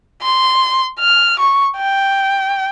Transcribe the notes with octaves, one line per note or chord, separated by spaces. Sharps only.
C6
F6
C#6
G5